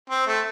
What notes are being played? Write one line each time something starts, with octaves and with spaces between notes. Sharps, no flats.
C4
A3